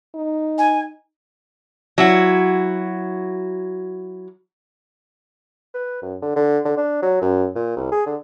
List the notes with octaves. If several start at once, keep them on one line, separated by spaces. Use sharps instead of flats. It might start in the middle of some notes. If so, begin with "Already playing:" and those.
D#4
G#5
F#3 E4 F#4
B4
F#2
D3
D3
D3
D4
F#3
F#2
A#2
C2
G#4
D3